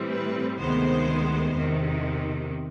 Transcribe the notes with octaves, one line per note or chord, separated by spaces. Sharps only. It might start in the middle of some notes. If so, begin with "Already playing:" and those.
Already playing: A2 E3 G3 C4
B4
D2 C3 D#3 G#3 B3 C5
E2 C3 D#3